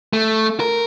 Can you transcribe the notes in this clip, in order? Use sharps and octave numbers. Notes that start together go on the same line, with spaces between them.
A3
A#4